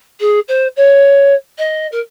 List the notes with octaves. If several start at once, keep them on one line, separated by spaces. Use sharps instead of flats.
G#4
C5
C#5
D#5
A#4